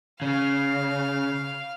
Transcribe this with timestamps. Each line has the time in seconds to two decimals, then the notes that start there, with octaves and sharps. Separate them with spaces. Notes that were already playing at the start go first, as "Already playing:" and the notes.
0.22 C#3 F5